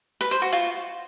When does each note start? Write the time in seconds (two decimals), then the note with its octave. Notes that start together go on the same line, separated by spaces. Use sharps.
0.21 B4
0.31 C5
0.42 F#4
0.53 F4